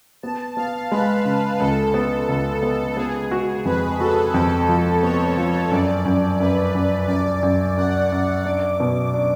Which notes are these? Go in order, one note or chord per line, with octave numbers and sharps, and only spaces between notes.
B3 A5
B3 F5
G#3 B4
C#3
C#2 A4
B3
C#2
B3
B3 G#4
F#4
F2 B4
F#4 A4
F2 A4
F3
B3 C#5
F3
F#2 D5
F#2
F#2 B4
F#2
F#2 D5
F#2
F#2 F#5
F#2
D4 D6
B2
D4